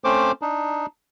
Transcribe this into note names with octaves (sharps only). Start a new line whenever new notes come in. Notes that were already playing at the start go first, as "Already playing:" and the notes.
A3 C4 C#4 C5 D6
D4 D#4